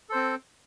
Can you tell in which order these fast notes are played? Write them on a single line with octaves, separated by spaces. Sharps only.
A4 C5 C4